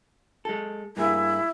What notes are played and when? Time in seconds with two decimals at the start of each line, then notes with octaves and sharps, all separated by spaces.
0.45 G#3 A4
0.97 G2 A#3 E4 G#4